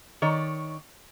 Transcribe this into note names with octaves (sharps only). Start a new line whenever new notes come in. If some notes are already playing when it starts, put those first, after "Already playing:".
D#3 C#5 D5